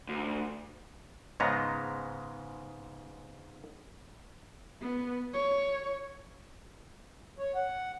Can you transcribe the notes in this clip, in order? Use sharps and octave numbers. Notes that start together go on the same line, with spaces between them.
D2
G#2 C#3 G#3 B3 A#5
B3
C#5
C#5
F#5